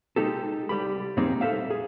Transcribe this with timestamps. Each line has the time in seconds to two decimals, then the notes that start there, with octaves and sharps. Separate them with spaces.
0.16 G#3 D#4 G4 A4
0.69 C2 G3 G4 B5
1.17 F2 A#2 G3 G#3 C4 D#4
1.41 A4 C5 E5 F5
1.70 G#4